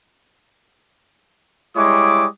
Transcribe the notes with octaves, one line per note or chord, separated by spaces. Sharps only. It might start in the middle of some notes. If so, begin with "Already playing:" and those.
G3 G#3 E4 C#5 D6 D#6